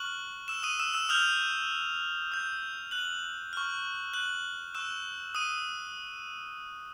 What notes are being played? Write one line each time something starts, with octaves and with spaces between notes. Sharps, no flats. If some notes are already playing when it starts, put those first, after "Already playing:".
Already playing: C#6 F6 F#6 F#7
E6 E7
D#6 D#7
E6 E7
E6 E7
D#6 F6 G6 F7
D#6 G6
F#6 F#7
C#6 F6
F#6 F#7
C#6 E6 F#6 E7
D#6 D#7